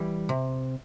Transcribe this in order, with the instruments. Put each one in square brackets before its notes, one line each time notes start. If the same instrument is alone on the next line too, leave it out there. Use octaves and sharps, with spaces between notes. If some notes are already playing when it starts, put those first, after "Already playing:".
Already playing: [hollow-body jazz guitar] E3 G3
C3